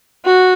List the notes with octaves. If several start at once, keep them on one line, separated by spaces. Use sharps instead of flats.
F#4